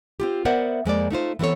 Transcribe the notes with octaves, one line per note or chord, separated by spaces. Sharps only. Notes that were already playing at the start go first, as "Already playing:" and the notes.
C4 F4 G4
B3 A#4 C5 D5 E5 F#5
F2 G#3 A#3 D5
A3 D#4 F4 C5
E3 B3 C4 A4 C#5